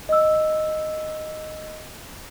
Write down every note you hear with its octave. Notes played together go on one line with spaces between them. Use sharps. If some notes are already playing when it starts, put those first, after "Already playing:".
D#5 E6